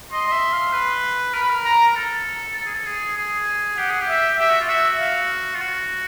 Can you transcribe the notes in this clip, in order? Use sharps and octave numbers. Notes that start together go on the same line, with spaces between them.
D#5 C6
D#5
E5
F5
B4
A#4 B5
B4
A#4
A#5
A4
A4
G#4
A4
G#4
G#4
G4 F#5
G#4
G4
E5
G4 E5
F#4
F4
F#4 E5
F5
F4
F#4